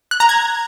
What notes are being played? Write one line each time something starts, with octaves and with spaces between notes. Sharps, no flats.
F#6
A#5
G#6